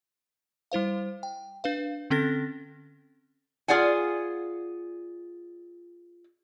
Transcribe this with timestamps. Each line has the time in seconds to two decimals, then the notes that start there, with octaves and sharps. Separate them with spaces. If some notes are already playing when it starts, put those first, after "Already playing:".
0.72 G3 E4 C5 F5
1.23 G5
1.64 D4 B4 F5
2.10 D3 C4 C#4 A4 A6 A#6
3.68 F4 G#4 D5 F#5 G#5